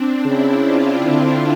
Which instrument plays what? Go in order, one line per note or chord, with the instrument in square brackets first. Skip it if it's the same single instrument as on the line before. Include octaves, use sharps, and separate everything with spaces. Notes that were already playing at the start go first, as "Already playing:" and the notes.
Already playing: [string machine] C4 D4
[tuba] C#3 [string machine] E4
[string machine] F4
[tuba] D3